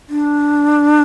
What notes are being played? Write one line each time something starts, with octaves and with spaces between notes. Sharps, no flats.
D4